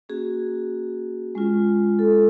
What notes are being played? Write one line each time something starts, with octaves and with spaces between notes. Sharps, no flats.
A#3 C#4 F#4 G#4
G#3 C#4 F4
A4